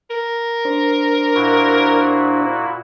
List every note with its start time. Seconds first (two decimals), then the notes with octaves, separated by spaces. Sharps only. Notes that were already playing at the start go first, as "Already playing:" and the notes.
0.10 A#4
0.65 D4 C5
1.35 A#2 E4 F#4